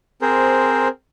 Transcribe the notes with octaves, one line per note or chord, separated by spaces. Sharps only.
C4 G#4 A#4 C5